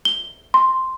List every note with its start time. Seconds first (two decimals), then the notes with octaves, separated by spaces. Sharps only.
0.05 G7
0.54 C6